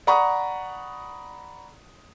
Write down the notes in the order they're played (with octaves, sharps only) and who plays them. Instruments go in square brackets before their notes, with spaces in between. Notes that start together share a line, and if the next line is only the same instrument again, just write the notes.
[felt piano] D5 F#5 A#5 B5 C#6 D#6